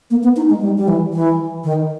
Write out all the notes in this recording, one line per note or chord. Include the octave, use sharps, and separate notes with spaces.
A#3
B3
D#4
G#3
G3
G3
E3
E3
D#3